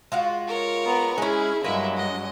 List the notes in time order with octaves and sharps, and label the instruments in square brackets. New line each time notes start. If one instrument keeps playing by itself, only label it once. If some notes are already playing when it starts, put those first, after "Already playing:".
[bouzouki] G#3 F4 F#4
[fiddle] A#4 C#5
[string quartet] B3 A#5
[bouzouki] G#3 C#4 [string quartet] E4 [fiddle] G#4
[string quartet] G2 F#3 G#3 [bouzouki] A#3 A#4 B4 [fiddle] E4 E5
[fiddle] D#5